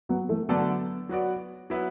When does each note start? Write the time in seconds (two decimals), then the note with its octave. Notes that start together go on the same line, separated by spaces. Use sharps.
0.09 F#3 B3
0.29 E3 A3
0.49 D3 F#3 A3 B3 D4 A4 D5
1.09 F#3 B3 F#4 D5
1.70 F#3 B3 E4 B4